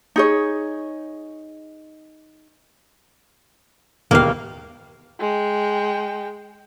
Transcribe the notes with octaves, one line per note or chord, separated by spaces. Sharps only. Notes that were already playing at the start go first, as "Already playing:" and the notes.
D#4 G#4 C#5
E1 D#2 A#3 F5
G#3 G5